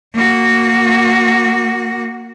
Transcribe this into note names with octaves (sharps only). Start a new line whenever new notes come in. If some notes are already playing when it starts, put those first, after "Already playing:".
A#3 F#4